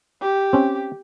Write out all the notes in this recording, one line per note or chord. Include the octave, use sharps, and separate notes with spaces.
G4
C4 C#4